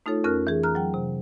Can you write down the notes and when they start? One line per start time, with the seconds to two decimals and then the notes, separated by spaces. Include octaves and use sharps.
0.06 A3 D#4 F4 A4 C#5
0.24 F2 C#4 A#4 F6 F#6
0.47 E3 G#4
0.63 A#5 F6 F#6
0.75 F#3 G5
0.94 C3